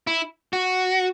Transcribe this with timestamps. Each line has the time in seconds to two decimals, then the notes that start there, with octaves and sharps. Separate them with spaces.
0.07 E4
0.53 F#4